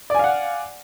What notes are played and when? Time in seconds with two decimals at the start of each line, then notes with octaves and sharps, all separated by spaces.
0.10 D5
0.15 G#5
0.19 F5
0.24 F#5